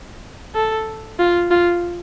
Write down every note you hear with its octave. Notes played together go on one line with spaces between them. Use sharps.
A4
F4
F4